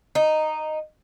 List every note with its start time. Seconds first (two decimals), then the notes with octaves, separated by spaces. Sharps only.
0.15 D#4